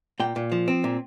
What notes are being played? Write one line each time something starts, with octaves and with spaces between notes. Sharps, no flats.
A#2 G5
A#2
F3
C4
A#2